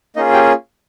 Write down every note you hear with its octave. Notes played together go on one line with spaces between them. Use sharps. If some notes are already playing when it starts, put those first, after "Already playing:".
A#3 C#4 D#4 F4 G#4 D#5
G4 G5